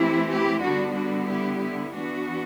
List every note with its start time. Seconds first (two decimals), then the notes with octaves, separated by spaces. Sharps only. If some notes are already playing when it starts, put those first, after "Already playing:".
Already playing: E3 A3 C4 E4 G4
0.29 E4 G4
0.62 D3 G3 B3 D4 F#4
0.95 D4 F#4
1.28 E4 G4
1.61 E4
1.94 E3 B3 D4 F#4